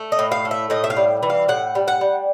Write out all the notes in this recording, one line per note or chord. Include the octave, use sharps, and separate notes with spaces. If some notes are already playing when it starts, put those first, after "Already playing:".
Already playing: A3
D#5
A2
F5
A3
E5
A2 D#5
E5
F5
G3
E3
F5
A2 F#5
G3
F#5
G3